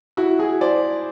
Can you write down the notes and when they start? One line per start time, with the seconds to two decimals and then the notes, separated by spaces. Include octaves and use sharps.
0.17 E4 F#4
0.39 F#4 G#4
0.61 C5 D5